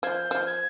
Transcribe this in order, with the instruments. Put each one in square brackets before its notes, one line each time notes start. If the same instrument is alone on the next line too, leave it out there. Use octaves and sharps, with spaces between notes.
[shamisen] F3 [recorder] G6 G#6
[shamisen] F3
[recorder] G#6